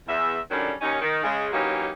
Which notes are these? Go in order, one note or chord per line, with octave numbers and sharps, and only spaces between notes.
E2 E5
D3 D#3 F#3 G3 C#4 D4
D#2 C#4 D#4
D#3
C#3 G#3
E3 F#3 A#3 C#4 D#4 G4